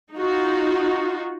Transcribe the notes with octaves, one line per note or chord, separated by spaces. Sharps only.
D#4 F4 F#4